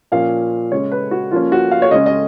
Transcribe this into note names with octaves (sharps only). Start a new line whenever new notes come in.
A#2 F3 A#3 C#4 F5
C#3 G#3 C#4 C#5
B4
F#4
F3 A#3 C#4 F4
F#4
F5
C#5
C#3 G#3 C#4 D#5
D#5